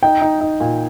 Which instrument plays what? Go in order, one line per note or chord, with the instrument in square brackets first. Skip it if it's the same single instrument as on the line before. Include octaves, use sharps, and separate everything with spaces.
[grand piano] D#4 [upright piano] G5
[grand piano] D#4
D#4
A#2